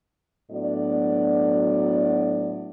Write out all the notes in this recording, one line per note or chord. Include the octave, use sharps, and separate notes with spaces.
A2 F#3 B3 D4 D5